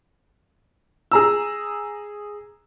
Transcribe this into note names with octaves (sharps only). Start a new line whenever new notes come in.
G#4 A#5 E6